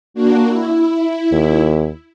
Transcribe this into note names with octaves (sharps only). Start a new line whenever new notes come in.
A#3 D4 F#4
E4
D#2